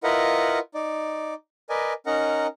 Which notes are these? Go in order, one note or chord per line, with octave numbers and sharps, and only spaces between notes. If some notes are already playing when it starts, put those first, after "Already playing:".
E4 F4 A#4 B4 D#5 F#5
D#4 D5
A#4 B4 D5 D#5 G#5
C#4 D#4 A#4 D#5 F#5 A#5